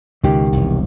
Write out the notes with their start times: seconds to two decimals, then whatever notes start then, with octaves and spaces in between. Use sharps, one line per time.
0.24 C#2 B2 D#3 G4
0.52 E1 C2